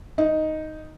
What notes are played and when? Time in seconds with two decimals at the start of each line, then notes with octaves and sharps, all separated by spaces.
0.18 D#4